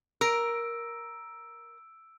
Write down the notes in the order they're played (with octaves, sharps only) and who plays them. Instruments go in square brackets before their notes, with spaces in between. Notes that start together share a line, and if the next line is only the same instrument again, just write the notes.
[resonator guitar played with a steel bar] A#4 [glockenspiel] E6 D7